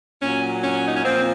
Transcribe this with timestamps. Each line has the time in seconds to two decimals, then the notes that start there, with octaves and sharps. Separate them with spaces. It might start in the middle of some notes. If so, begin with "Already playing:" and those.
0.21 A#2 F#3 C#4
0.62 C#4
0.87 D#4
0.95 C#4
1.03 A#2 F3 C4